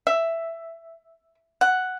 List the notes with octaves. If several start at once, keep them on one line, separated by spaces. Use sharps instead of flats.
E5
F#5